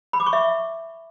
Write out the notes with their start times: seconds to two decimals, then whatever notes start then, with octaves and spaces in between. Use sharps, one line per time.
0.13 B5
0.20 D6
0.26 C#6
0.33 E5